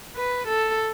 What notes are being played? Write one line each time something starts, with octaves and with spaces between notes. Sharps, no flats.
B4
A4